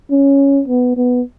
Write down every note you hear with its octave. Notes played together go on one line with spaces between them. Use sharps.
C#4
B3
B3